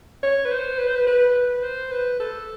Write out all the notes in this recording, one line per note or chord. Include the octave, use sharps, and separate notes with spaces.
C#5
B4
C5
B4
C5
B4
B4
B4
C5
B4
A4